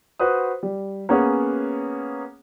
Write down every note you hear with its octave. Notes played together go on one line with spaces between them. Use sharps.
F#4 B4 C5 D#6
G3
A#3 B3 C#4 G#4 C#5 F#5